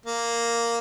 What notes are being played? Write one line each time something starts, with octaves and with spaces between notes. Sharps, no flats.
A#3